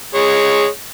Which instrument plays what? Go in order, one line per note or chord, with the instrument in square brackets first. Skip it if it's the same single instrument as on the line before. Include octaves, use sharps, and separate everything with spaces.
[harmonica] G#3 C#5